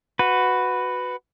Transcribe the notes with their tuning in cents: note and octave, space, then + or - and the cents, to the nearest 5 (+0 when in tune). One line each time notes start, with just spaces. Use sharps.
F#4 -5 B4 +10